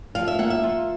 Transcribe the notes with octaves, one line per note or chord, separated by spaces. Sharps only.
F3 F5
E5
A#3 F#5
E5
F4